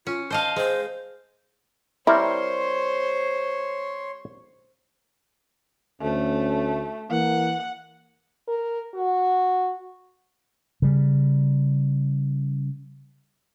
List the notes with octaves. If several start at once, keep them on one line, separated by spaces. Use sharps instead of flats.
C#4 F4
C5 D#5 F5 A5
G#3 C5
G3 C4 E4 A#4 C5 C#5 C6
D2 A3 C#4
E3 A#3 F#5
A#4
F#4
C#3 G3